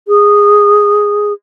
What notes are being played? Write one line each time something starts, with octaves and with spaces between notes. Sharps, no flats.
G#4